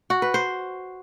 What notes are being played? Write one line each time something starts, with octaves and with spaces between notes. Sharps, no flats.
F#4
B4
C5